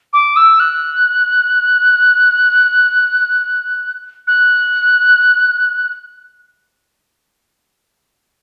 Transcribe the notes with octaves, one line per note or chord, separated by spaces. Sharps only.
D6
E6
F#6
F#6